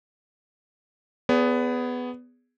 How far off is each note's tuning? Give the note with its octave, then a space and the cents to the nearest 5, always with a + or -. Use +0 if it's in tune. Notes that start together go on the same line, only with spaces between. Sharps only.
B3 +10 G#4 +0 D5 -40